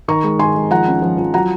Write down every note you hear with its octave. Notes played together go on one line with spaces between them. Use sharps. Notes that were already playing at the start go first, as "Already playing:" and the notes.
D#3 A#5 C#6
G#3
D#3 G#5 C6
G#3
F3 F#5 A#5
C#4
F3
F3
F#3 F#5 A#5